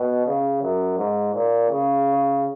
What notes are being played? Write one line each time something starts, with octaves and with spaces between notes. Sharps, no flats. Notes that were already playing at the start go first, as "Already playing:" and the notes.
Already playing: B2
C#3
F#2
G#2
A#2
C#3